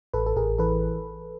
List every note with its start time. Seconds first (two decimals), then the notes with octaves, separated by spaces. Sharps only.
0.14 A1 A4 B4
0.26 A4
0.36 A1 G#4 A#4
0.58 E3 A4 B4